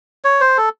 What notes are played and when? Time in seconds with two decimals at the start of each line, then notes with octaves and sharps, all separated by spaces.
0.24 C#5
0.41 C5
0.57 A4